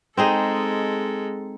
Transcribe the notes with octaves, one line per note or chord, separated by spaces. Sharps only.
G#3 C4 D#4 G#4 A4